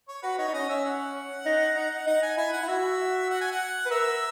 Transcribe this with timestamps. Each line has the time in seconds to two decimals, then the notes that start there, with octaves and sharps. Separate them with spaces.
0.08 C#5
0.22 F#4 B4
0.38 D#4 C#5
0.48 D#4
0.54 C#4 D#5
0.69 C#4 E5
0.85 F#5
1.46 D#4
1.76 D#4
2.07 D#4 F#5
2.22 G#5
2.37 E4 G#5
2.52 F#5
2.63 E4
2.68 F#4 E5
3.30 F#5
3.41 G#5
3.51 F#5
3.86 B4
3.91 A#4 E5